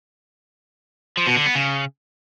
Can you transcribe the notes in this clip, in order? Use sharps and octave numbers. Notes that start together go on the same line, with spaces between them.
F3
B2
D3
B3
C#3